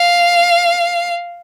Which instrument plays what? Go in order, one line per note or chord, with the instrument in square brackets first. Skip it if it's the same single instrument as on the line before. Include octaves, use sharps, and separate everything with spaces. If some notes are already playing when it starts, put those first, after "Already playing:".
Already playing: [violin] F5